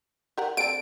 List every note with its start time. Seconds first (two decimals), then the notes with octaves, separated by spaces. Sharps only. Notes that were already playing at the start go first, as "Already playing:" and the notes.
0.38 G4 A#4 F#5
0.57 D3 C4 A4 D7